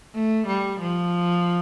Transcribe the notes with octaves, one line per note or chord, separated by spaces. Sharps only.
A3
G3
F3